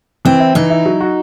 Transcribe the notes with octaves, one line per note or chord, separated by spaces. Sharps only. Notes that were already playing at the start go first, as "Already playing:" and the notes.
E3 C4
E4
E3 D#4
E4
F#3
F#4